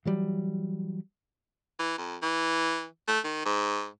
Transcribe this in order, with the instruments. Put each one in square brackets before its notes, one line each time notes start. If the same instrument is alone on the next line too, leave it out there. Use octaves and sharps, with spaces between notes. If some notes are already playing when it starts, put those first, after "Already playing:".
[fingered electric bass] E3 F#3 G3
[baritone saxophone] E3
F2
E3
A3
D#3
G#2